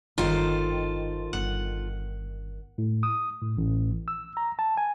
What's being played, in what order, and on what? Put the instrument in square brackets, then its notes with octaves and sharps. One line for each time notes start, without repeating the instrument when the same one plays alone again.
[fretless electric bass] G1 [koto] D#3 [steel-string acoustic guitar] F4 A4 C5
[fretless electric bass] G1 [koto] F#5
[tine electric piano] A2
D#6
A2
A1
E6
A#5
A5
G#5